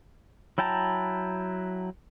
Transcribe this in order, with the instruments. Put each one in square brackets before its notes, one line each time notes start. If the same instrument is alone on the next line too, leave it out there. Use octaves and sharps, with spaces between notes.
[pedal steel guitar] F#3 E4 G5 A5 A#5